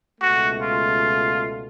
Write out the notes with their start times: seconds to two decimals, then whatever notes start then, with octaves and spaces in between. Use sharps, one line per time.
0.21 C#2 B2 A3 F#4
0.62 F4